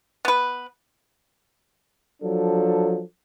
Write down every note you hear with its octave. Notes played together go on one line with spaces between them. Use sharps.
B3 B4
F3 F#3 D4 A4